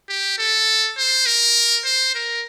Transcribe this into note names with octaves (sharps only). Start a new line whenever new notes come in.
G4
A4
C5
A#4
C5
A#4